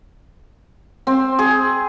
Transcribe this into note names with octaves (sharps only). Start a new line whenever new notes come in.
C4
G#4